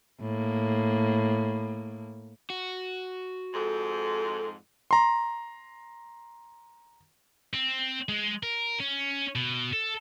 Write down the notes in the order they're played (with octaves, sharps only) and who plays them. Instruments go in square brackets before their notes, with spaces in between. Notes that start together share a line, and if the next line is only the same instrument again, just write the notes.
[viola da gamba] A2 A#3
[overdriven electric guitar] F#4
[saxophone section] F2 G#2 [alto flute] A4
[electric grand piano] A#5 C6
[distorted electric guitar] C4
G#3
A#4
C#4
B2
A4